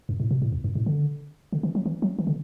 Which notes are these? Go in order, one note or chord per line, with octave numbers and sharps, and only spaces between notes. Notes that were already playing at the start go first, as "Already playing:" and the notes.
F#2
A2
B2
A2
E2
F#2
A2
D3
D3
E3
F#3
E3
F#3
E3
D3